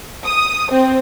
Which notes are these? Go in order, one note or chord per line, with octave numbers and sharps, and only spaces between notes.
D#6
C4